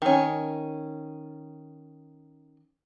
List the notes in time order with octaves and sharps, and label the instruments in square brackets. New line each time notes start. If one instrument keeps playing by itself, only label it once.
[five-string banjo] D#3 C#4